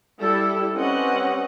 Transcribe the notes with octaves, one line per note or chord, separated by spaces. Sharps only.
G3 E4 A4
G3 C4 C#4 B4 D#5 F#5